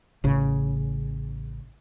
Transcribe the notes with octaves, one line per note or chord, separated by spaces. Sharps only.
A1 C#3